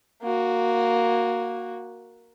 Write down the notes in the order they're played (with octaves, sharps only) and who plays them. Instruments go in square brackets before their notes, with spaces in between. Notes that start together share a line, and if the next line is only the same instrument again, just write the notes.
[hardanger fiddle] A#3 F#4